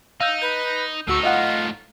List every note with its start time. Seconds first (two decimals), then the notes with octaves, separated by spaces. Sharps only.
0.20 D#4 F5 E6 G6
0.42 B4 G6
1.08 D2 A2 D#4 F#4 C#6 E6
1.23 F4 D#5 F5 F#5